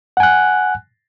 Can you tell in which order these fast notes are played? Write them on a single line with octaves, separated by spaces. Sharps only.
F#5 G#5 F#6